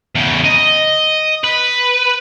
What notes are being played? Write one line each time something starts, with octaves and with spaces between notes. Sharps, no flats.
E2 C#3
D#5
B4